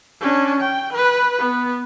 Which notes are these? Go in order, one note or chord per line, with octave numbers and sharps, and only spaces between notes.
C#4 D4
G5
B4
B3